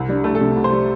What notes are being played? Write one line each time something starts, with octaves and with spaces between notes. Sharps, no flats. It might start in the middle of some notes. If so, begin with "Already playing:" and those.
Already playing: C2
G3 D4
C2 A3
A4
C3 G4
C2
C5
G3